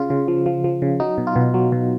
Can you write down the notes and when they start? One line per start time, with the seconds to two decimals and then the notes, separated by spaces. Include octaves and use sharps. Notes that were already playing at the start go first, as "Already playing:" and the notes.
Already playing: C#3 F4
0.10 C#3
0.28 F3
0.46 F3
0.64 F3
0.82 C#3
1.00 F#3 D#4
1.18 B2
1.27 F4
1.36 B2
1.54 F#3
1.72 B2